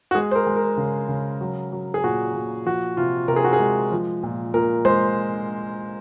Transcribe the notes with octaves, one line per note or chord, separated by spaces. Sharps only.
F#4
G#3 G#4
C5
A#4
G#3
A#4
C#3
C#3
F#3
F#3
G#4
A#2 F#4
A#2
F3 F#4
C3 F4
C3 A#4
G#4
F#4
G#4
G#3
F3
A#2
A#2 A#4
G#3 C5